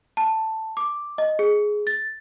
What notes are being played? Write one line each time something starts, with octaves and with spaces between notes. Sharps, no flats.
A5
D6
D#5
G#4
A6